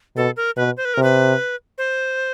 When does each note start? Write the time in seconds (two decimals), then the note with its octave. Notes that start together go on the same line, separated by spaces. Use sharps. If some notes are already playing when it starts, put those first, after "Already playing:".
0.16 B2 A4
0.37 A#4
0.57 B2 B4
0.77 C5
0.85 B4
0.94 C3 A#4
1.03 B4
1.78 C5